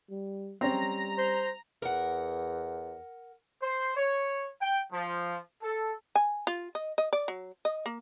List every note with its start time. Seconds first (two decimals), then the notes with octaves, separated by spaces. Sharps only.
0.10 G3
0.61 G3 C4 C#4 A#5
1.18 C5
1.82 E2 A#4 F#5
3.62 C5
3.97 C#5
4.61 G5
4.92 F3
5.63 A4
6.15 G#5
6.47 F4
6.75 D#5
6.98 D#5
7.13 D5
7.28 F#3
7.65 D#5
7.86 A#3